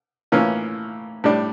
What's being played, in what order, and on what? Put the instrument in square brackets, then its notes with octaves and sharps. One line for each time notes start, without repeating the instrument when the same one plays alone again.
[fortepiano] A2 E3 A#3 C#4 F4
A2 G3 D4